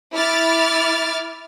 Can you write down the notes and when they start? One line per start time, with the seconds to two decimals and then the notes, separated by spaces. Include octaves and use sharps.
0.14 E4 D6 F6 A6